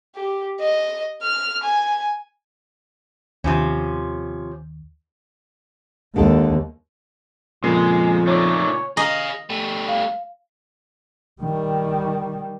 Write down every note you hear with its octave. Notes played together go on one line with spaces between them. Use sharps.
G4
D#5
F6
G#5
D#2 C3 F3 C#4
D#2 D3 G#3 A4
F2 A#2 C#3 G#3 A#3
A3 D#4 C#5 D5
G#4 D#5 F5 A#5
G3 A3
F5
D#3 G3